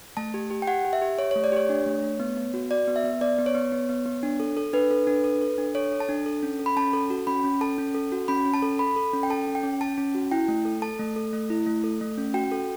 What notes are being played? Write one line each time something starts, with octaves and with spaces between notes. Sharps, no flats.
A3 A5
G4
G4
G5
G4 F#5
G4
E5
G4
G4 C#5
A3 C#5
D5
G4 C#5
D4
A3
A3
B3
B3
F#4
F#4 D5
B3
E5
B3
B3 D5
B3
C#5
B3
B3
B3
B3
D4
A4
A4
D4 B4
A4
D4
A4
A4
D4
A4 C#5
A4
A5
D4
A4
C#4
A4
B5
C#4 A5
A4
F#4
C#4 B5
C#4
A4 A5
C#4
A4
F#4
C#4 B5
C#4
A5
A4
A4 B5
A4
C#4
G5
A4 A5
C#4
G5
C#4
C#4 A5
C#4
F#4
E4 G5
A3
A4
A4 A5
A3
A4
A3
E4
A3
A4
A3
C#4
F#4 G5
A4